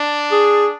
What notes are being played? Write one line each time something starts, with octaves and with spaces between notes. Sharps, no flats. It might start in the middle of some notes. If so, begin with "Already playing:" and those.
Already playing: D4
G#4